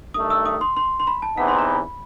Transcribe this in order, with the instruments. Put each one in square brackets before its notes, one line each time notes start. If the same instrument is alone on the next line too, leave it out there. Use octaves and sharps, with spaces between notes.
[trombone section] G2 D#3 A3 [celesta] D#6
[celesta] E6
D#6
C6
C6
C6
B5
A5
[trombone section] E2 C3 E3 B3 D#4 [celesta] F#5
[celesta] C6
B5